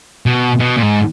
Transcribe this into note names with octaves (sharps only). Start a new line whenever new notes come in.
B2
B2
A#2
G#2